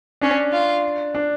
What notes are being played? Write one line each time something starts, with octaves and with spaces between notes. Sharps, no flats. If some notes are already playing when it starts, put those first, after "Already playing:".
C#4 D4
F4
D4